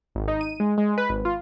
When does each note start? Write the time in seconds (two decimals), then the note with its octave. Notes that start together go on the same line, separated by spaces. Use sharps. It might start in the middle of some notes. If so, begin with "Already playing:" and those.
0.15 G#1
0.28 D#4
0.41 D#7
0.60 G#3
0.78 G#3
0.98 B4
1.10 G#1
1.25 F4